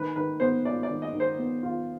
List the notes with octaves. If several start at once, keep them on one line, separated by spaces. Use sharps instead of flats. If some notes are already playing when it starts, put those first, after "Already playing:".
Already playing: D#3 B4
D#3 B4
B3 C5
F4 D5
D5
D#3
D#5
D#3
C5
B3
F4